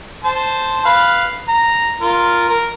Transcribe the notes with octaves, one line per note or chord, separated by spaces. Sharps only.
C5 A5
B4 F5
A#5
F4 A#4
A#4